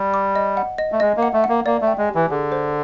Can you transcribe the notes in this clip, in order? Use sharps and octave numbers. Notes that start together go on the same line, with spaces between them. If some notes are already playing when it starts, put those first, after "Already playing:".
Already playing: G3
D6
D#5
F#5
D#5
A3
G#3 D#5
A#3
F#5
A3
F#5
A#3
A#3 D5
A3
G5
G#3
G4
E3
D3 G#4
C5